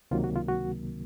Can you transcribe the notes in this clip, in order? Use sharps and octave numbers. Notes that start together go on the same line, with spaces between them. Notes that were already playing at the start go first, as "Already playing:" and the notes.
C#2 C3 D#3 F#3 A#3 F4
F#4
F4
F#4